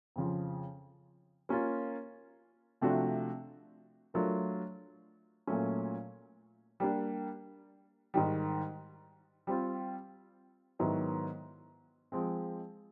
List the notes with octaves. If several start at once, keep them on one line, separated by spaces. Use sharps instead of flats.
F2 C#3 F3
A#3 C#4 F4
C3 F3 A3 D4 F#4
F#3 A3 D4 F4 A#4
A#2 F#3 A3 C#4
G3 A#3 D4
G#2 D#3 G3
G3 C4 F4
G#2 D#3 F#3 B3 E4
F3 G#3 C4